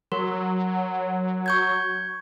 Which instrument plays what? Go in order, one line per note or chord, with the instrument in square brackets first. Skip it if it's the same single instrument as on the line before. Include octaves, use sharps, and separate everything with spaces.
[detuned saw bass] F#3 [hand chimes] A#4 C6
[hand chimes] C#6 G6 G#6